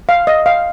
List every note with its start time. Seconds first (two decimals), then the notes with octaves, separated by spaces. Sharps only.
0.09 F5
0.27 D#5
0.46 F5